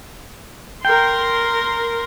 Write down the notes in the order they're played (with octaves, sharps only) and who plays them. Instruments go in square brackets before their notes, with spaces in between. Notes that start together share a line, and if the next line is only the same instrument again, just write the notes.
[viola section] A#4 C6 [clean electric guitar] G5